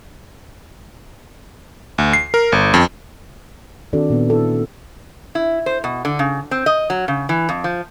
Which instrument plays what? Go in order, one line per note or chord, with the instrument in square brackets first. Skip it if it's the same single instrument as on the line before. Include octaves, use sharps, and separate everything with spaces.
[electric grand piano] D2
C7
A#4
G1
F2
[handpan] D#3 C4 D4 F#4 A4 D5
A#2 B3
E4 A4
[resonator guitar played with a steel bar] E4
C5
B2
D3
C#3
C4
D#5
F#3
C#3
E3
F2
F3